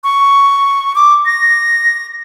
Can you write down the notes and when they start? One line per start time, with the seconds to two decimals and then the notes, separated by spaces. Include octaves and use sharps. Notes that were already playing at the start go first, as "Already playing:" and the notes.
0.04 C#6
0.95 D6
1.26 A#6